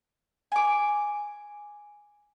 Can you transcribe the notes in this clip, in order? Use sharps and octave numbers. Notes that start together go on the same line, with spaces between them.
G#5 D6